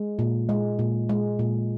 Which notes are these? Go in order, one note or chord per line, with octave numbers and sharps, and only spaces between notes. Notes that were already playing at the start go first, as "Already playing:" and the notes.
Already playing: G#3
A#2
G#3
A#2
G#3
A#2